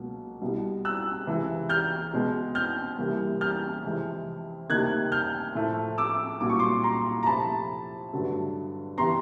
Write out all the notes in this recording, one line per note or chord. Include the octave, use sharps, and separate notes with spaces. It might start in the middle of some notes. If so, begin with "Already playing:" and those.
Already playing: C#2 B2 F#3 A#3
C2 B2 G3
E6 F#6
C#2 C3 E3
F6 G6
B2 G#3 B3
F6 G6
C2 C3 E3 G3 A#3
F6 G6
F2 C3 E3 G#3
D2 C3 D#3 G3 A#3 F#6 G#6
F6 G6
A2 F3 A3
D6 E6
C2 A#2 F#3 D6
C#6
C6 D6
A#5 C6
A#5
F2 C3 F3 A3 A5 B5
G2 D3 F#3 A3
E3 G3 B3 A#5 C6